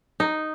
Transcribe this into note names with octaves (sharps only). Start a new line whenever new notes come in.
D#4